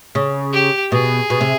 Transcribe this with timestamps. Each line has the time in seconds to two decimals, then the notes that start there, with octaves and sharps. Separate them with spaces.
0.15 C#3
0.53 G4
0.92 B2 G#4
1.30 B2
1.41 C3